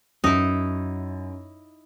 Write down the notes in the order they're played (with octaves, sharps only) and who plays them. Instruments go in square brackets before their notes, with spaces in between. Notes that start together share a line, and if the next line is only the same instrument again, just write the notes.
[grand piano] F#2 [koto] D#4 E4